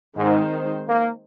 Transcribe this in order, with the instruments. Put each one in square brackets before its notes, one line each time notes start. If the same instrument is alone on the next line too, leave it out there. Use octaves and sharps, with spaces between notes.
[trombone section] G#2 [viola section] D#3 G#3 C4 D#4 C5
[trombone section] A#3